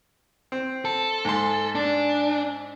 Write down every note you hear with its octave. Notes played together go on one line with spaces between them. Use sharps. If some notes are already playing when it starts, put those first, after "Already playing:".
C4
A4
G#2 C6
D4